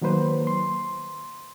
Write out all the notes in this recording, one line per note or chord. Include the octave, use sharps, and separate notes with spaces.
D#3 F#3 A#3 B4 C5
C6